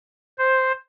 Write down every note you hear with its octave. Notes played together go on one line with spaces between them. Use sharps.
C5